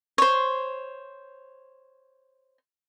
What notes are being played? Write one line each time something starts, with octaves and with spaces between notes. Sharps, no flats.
C5 C#5